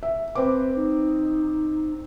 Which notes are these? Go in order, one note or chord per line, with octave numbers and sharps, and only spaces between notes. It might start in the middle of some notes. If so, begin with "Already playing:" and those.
E5
C4 B4 D6
D#4